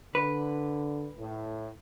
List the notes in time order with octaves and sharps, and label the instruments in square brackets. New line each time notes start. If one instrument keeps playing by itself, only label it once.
[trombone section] D3 [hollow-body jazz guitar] B4
[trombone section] A2